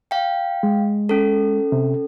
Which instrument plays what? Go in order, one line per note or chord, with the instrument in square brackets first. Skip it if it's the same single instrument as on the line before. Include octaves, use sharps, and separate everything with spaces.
[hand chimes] F5 G5
[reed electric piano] G#3
[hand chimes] C#4 A4
[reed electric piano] C3